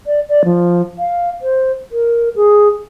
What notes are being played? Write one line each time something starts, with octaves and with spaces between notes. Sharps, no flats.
D5
D5
F3
F5
C5
A#4
G#4